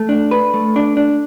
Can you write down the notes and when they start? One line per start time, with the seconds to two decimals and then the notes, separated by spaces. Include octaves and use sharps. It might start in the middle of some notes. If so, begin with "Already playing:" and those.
Already playing: A3
0.09 D4
0.31 B4
0.54 A3
0.76 D4
0.97 D4